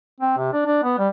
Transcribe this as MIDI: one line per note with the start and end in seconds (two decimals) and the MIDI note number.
0.20 0.34 60
0.37 0.49 48
0.53 0.65 62
0.66 0.79 62
0.84 0.95 59
0.98 1.08 55